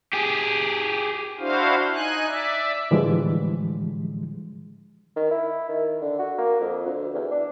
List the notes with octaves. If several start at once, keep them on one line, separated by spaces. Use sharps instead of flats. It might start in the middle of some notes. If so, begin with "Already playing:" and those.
G4 G#4
D4 E4 F#4 C5 F5
D#4 G#5 F#6
D5 E5
A2 D3 E3 F3 G3 G#3
D#3
E4
D#3
D3
F#4
A#3
F2
D2
E2
D4